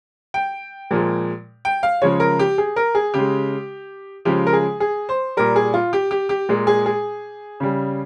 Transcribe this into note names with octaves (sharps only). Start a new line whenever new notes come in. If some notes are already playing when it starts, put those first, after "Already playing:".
G5
A#2 F3 G#3
G5
F5
C#3 F3 G#3 C#5
A#4
G4
G#4
A#4
G#4
C#3 G#3 G4
C#3 F3 G#3 G4
A#4
G#4
G#4
C5
A#2 G3 A#4
G#4
F4
G4
G4
G4
A#2 G#3
G#4
G#4
C#3 G3